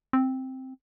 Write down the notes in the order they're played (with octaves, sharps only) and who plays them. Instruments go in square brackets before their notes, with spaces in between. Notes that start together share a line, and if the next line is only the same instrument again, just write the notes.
[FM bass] C4